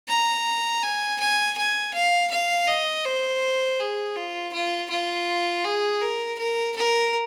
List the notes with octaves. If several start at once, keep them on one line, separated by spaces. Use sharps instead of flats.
A#5
G#5
G#5
G#5
F5
F5
D#5
C5
G#4
F4
F4
F4
G#4
A#4
A#4
A#4